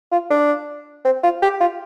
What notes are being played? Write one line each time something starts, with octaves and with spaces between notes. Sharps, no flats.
F4
D4
C4
F4
G4
F4